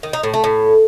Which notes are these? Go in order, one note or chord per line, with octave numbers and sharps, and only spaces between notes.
D#3
D#4
A2
A3
A2